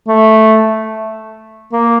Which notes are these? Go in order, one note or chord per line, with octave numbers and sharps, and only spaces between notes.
A3
A#3